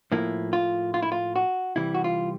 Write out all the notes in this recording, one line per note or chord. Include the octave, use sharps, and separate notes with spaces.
A2 F3 A#3 E4
F4
F4
E4
F4
F#4
C2 C3 E3 G3 E4
F#4
F4